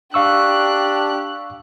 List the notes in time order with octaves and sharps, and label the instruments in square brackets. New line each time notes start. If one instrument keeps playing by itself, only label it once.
[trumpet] D4 [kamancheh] G4 F#6 [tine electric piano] F5 C#6 E6